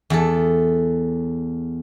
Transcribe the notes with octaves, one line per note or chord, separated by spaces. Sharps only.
E2 A4